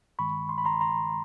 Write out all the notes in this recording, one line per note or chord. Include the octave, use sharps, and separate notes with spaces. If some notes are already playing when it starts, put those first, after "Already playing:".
G2 D#3 G#3 B5 C#6
C6
B5
A#5 C6
A#5 C6